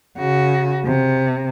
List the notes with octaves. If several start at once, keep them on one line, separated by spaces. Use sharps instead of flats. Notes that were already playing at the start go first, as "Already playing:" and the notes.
C#3 F#4
C3